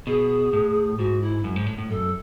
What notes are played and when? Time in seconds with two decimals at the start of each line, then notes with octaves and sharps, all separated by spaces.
0.07 B2 G#4
0.53 A2
0.98 G#2 F#4
1.22 E4
1.44 F#2
1.56 G#2
1.66 A2
1.78 A2
1.89 F#2 A4